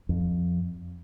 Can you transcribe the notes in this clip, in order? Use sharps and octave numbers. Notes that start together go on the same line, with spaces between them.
F2